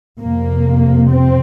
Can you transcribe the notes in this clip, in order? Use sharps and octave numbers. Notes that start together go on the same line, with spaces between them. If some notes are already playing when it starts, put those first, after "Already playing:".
F2 C3 A#3
C4